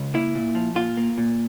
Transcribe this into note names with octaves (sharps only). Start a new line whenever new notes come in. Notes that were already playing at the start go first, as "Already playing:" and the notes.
Already playing: C#2
A#3 E4
A#2
F3
A#2 F4
A#3
A#2